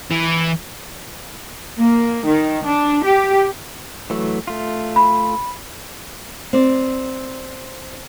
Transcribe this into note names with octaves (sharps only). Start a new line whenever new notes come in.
E3
A#3
D#3
D4
G4
E3 F#3 A3
A3 F4
B5
C4 D5